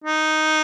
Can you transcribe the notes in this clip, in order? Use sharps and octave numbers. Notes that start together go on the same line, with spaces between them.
D#4